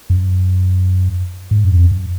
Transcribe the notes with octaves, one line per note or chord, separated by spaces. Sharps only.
F#2
G#2
F#2
F2
F#2